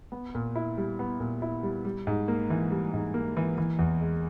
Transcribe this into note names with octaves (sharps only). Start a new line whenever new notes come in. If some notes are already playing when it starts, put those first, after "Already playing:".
B3
A#2
E4
G3
B3
A#2
E4
G3
G3
G#2
A#3
E3
G3
G#2
A#3
E3
E3
E2
G#3